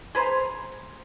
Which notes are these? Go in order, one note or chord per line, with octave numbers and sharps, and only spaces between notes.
G#4 B4 C5 A#5